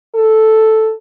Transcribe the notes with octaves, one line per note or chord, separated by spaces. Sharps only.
A4